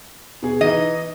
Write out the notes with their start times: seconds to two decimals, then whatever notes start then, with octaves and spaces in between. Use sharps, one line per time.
0.42 B2 G#4
0.61 E3 D#4 D#5